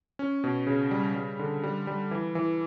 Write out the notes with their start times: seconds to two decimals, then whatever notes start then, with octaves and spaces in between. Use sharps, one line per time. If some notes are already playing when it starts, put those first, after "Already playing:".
0.19 C#4
0.44 B2
0.67 C#3
0.91 G3
1.15 G3
1.39 D3
1.64 G3
1.87 G3
2.11 E3
2.35 E3